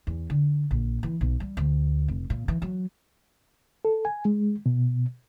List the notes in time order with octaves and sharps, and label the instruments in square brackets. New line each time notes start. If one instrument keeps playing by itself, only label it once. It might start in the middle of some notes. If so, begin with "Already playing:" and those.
[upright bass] E2
D3
A#1
E3
B1
G3
D2
F1
A#2
E3
F#3
[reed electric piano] A4
G#5
G#3
B2